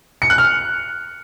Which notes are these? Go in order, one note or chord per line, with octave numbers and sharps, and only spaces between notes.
C#7
F#6
F6